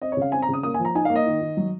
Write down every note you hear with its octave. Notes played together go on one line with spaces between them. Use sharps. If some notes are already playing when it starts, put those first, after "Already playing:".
C4 D#5
C#5
C#3 F5
C4 G#5
A#5
C#3 D#6
A#3 D#6
G#5
F3
A#5
D#4 G#5
F5
A#3
D#5
D#3
D#3
F#3